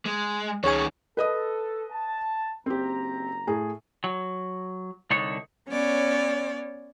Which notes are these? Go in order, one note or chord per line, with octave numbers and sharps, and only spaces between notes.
G#3
C#2 D#3 C#4 G#4 C#5 G#5 C#6
A4 B4 D#5 D#6
A5
F#1 C4 G4 A#5
A2 G#4
F#3
C2 D3 D4 D#4 C#5
B3 C#4 C#5 D5